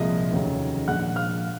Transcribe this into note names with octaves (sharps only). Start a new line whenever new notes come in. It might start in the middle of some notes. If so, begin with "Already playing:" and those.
Already playing: C2 A#2 F3 G#3 D#5
F1 D#2 C#3 F#3
A#1 A#2 F3 G#3 F#5 F#6
F5 F6